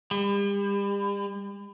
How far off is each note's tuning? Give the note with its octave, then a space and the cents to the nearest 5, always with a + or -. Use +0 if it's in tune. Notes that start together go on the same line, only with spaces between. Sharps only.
G3 +40